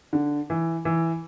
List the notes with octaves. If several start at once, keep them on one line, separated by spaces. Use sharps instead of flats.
D3
E3
E3